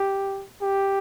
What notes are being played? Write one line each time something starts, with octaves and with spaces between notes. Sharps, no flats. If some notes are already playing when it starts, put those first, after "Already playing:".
Already playing: G4
G4